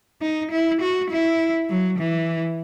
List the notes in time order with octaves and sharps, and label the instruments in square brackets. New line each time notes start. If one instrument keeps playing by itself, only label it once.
[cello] D#4
E4
F#4
E4
F#3
E3